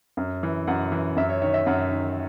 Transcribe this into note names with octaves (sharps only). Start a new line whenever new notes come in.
F#2
E3
F#2 F#5
E3
F#2 E5
C#5
D#3 C#5
E5
F#2 F#5
D#3